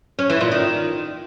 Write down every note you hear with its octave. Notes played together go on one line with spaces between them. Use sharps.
C#4
E3
A#2
D#3